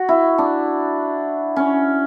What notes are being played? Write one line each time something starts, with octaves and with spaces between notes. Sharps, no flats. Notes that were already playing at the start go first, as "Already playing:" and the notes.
Already playing: F#4
E4
D4
C#4